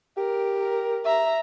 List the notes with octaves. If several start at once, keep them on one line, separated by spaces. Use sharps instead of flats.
G4 A#4
A#4
E5 A#5